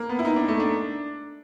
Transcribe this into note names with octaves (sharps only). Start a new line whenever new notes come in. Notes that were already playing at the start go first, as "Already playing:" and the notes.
Already playing: A#3
B3
E4
D#4
D4
A3
D4